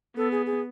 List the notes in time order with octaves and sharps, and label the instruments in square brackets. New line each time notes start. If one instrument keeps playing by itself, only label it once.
[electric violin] B3 [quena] A4
[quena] G#4
G#4